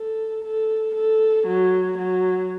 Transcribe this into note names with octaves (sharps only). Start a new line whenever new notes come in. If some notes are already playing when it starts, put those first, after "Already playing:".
Already playing: A4
A4
A4
F#3
F#3